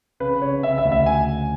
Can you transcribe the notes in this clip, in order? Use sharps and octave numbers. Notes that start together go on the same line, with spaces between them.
C#3 B4
C#3 C#5
C#3 E5
E5
D2
E5
G#5